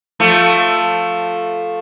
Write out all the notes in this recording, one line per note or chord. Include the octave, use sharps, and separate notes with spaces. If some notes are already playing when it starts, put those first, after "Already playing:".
F3 A3